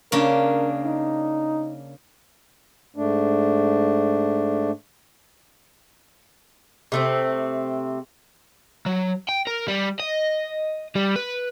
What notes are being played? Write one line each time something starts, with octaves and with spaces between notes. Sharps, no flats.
C#3 A#3 D4 A#4
D#4
G#2 A3 D4
C3 A3 C4
F#3
G5
A#4
G3
D#5
G3
B4